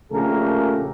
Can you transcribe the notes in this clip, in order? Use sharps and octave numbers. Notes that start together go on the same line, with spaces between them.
A#1 C#3 A3 G4 A4 A#4